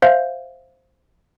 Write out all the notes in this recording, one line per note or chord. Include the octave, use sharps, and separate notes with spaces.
C5 E5 F5 G6